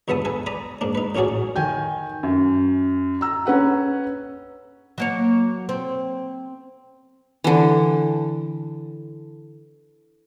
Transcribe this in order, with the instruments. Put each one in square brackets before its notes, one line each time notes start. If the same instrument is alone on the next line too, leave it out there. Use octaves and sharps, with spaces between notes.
[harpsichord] C#2 G2 B3 E5 A5 D#6
A4 B4 G#5
D5 A#5 B5 D#6
G#2 A#3 D4
D#4 B4
A1 A2 C#4 F#4 G#4 D5
[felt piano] D#3 G5 G#5 G6
F#2
A#5 E6
C#4 B4 F#5 A#5
[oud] F#3 A#3 C#5
C4
[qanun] D3 E3